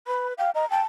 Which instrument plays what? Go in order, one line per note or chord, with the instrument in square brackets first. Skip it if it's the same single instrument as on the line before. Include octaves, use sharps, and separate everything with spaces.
[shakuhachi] B4 [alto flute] B5
[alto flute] F5 [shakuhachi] G5
[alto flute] D#5 [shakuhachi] A#5
[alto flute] G5 [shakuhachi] A5